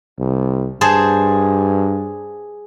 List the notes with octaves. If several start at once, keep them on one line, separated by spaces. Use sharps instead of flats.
C2
G2 G#4 C5 A5